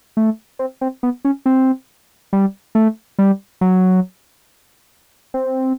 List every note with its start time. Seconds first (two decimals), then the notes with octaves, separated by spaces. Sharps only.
0.17 A3
0.59 C4
0.81 C4
1.03 B3
1.25 C#4
1.46 C4
2.33 G3
2.75 A3
3.19 G3
3.61 F#3
5.34 C4